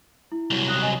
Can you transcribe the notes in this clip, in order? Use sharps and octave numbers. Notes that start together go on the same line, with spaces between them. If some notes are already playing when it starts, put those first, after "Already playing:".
E4
C2 F#3
D#6 F#6
D#5 G#5